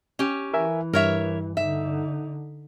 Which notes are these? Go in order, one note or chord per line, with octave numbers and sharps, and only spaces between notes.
C#4 G4
E3 A#4 E5 G#5
G2 A#4 C#5 E5
D3 D#4 E5